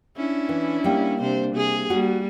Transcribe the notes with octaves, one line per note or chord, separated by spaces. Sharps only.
C#4 D4 E4
E3
G3 A#3 G5
C3 D4 C5
C3 G#4
G3 A#3 F#4